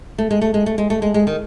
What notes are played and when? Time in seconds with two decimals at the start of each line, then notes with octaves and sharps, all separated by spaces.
0.18 A3
0.31 G#3
0.41 A3
0.54 G#3
0.66 A3
0.78 G#3
0.90 A3
1.02 G#3
1.14 G#3
1.27 D#3